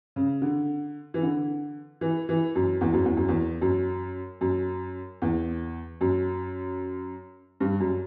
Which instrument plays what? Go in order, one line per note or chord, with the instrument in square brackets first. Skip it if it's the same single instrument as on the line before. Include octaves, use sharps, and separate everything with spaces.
[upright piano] C#3
D3
E3
D3
E3
E3
F#2
E2
F#2
E2
F#2
E2
F#2
F#2
E2
F#2
G2
F#2